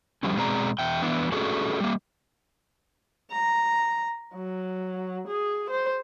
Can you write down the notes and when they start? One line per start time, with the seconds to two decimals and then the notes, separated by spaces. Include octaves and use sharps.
0.23 D3 F3 G3 C#4
0.37 B2 G#3 C4 G#4 D5 A#5
0.79 E2 E5 G5
1.02 E3 B3 D4 E4
1.32 A3 C#4 D4 F#4 G#4 A4
1.80 G3 A#3
3.31 A#5
4.34 F#3
5.27 G#4
5.70 C5